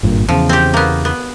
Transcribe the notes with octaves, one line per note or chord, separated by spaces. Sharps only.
G#1 G2 A#2
E2 C#3 F3
C4 G4
A#3 B3
B3